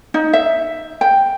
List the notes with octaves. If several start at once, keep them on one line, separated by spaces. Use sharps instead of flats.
D#4
E5
G5